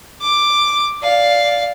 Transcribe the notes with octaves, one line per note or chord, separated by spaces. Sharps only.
D6
D5 F5